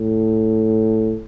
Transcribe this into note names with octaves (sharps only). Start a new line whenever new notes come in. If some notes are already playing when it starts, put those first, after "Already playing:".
Already playing: A2